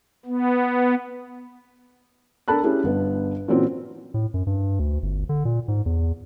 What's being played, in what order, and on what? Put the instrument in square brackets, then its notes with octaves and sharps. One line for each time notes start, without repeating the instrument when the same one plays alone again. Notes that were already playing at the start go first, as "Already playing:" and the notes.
[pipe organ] B3
[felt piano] D4 A4 A#4 A5 B5 F#6
C#4 E4 G4 G#4
G1 B3
A#2 E3 F#3 C4 C#4
[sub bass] A2
F#2
G2
D2
G1
D3
A#2
G#2
E2